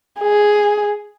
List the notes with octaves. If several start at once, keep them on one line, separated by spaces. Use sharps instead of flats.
G#4